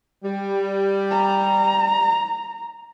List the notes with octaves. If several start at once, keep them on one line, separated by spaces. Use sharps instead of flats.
G3
A#5